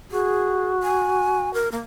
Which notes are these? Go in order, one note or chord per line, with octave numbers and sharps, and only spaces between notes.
F#4 G#4
G#5
A#4
A#3